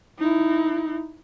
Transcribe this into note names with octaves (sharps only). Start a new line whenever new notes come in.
D#4 E4